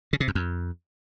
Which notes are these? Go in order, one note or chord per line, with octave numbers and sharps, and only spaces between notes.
C#3
C3
F#2
F2